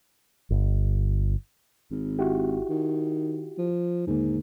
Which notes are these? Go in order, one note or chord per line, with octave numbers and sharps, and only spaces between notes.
G1
G#1
E4 F#4 G4
D#3
F3
D#2 G#2 D3 A#3